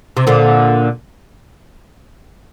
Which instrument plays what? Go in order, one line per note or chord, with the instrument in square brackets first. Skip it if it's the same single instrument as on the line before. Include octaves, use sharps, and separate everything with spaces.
[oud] C3
A#2 D3